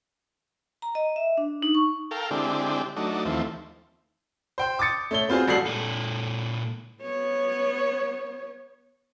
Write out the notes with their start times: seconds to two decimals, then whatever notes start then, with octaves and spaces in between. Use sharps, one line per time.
0.82 A#5
0.95 D#5
1.16 E5
1.37 D4
1.62 D#4
1.75 C#6
2.11 A4 A#4 F5 G5
2.31 D3 G#3 C4 D4 E4 G4
2.96 F#3 A3 D4 D#4
3.25 D#2 E3 F3 A3 C4
4.58 C5 G5 C6
4.79 D6 D#6 A6 C#7
5.11 A3 C#5 G7
5.29 B3 C4 F4 F#4 G#4 C5
5.48 A1 G3 F#4 A4 C7 F#7
5.66 A#2 A4
7.02 B3 C#5